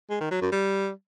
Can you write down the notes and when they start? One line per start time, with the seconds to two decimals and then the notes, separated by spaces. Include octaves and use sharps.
0.10 G#3
0.20 D#3
0.31 F#3
0.41 F#2
0.52 G3